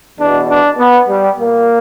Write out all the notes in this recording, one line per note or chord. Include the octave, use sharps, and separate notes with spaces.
E2 B2 D4
D4
B3
G3
A#2 A#3